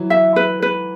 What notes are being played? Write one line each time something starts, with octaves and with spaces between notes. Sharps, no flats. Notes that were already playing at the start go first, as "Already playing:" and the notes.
Already playing: E3 F#3
E5
B4
B4